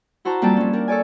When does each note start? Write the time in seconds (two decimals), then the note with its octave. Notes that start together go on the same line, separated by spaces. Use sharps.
0.25 E4 F#4 C5 A5 A#5
0.42 F2 G3 A#3 G5 A5
0.57 G3 C#4
0.73 D4 A#4
0.88 A4 C#5 D5 G#5